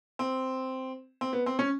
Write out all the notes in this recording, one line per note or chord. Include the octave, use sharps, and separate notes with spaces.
C4
C4
B3
C4
C#4